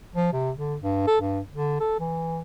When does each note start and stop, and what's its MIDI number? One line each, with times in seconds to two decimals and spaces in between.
0.15 0.30 53
0.33 0.51 48
0.57 0.76 50
0.81 1.04 43
1.07 1.18 69
1.20 1.40 43
1.53 1.78 50
1.80 2.00 69
2.00 2.41 52